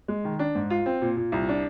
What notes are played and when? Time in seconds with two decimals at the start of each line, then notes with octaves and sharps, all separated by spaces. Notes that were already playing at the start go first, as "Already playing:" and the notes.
0.08 G#3
0.24 D#3
0.39 D4
0.55 G#2
0.70 F4
0.86 C4
1.02 A#2
1.17 A#2
1.32 C2
1.49 D4